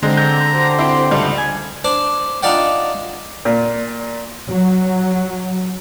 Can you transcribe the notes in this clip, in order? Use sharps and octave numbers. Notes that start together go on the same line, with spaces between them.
D3 G#3 C4 A#5
A#5 G6
D2 G4 C5
C4 E4
C#2 G3 A3
G#5
D4 C5 D6
D4 D#4 F4 D5 F#5 G5
A#2
F#3